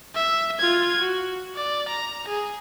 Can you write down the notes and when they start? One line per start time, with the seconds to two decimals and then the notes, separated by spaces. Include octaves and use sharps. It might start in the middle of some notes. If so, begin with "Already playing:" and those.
0.15 E5
0.59 F4 G#6
1.01 F#4
1.56 D5
1.88 A#5
2.28 G#4